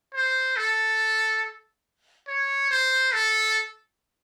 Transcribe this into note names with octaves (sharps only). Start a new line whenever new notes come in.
C5
A4
C#5
C5
A4